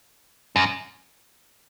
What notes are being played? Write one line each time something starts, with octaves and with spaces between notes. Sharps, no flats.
F#2